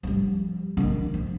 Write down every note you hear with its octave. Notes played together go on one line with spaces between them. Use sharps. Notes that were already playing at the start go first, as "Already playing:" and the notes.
F3 G3
D#3 D4
F3